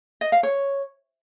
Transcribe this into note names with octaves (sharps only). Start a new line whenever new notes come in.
D#5
F5
C#5